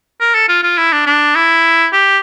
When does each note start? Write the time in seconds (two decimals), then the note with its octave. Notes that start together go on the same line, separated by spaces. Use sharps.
0.21 A#4
0.35 A4
0.49 F4
0.63 F4
0.78 E4
0.92 D4
1.06 D4
1.35 E4
1.93 G4